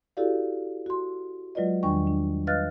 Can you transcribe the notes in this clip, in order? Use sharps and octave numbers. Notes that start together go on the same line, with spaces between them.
E4 F#4 G4 A4 D5 F5
F#4 C6
F#3 G#3 F4 B4 D5 D#5
E2 D#3 G3 D4 G5 C#6
D4
B4 D#5 F5 F6 F#6 A6